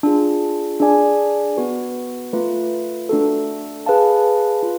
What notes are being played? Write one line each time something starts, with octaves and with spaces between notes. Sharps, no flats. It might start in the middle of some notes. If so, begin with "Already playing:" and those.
D4 F4 G#4
D4 G#4 D5 G#5
B3 F#4 B4
A3 F4 B4
A3 D4 F#4 A4
G#4 B4 F5 A5
F4